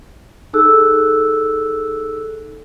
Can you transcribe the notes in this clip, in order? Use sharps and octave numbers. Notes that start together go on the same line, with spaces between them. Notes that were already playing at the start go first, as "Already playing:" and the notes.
D#4 G#4 A4 E6 F#6